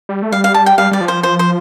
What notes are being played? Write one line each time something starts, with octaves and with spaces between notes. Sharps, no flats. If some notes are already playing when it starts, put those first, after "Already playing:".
G3
A3
G3 F5
F5
A5
G5
G3 F5
G3 D5
F3
C5
C5
C5